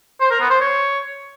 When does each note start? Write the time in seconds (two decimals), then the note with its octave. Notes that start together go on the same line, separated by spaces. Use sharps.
0.20 C5
0.30 A#4
0.40 B3
0.50 C5
0.60 C#5